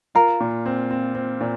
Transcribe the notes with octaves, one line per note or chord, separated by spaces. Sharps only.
F4 A#4
A#2
C4
C4
C4
A#2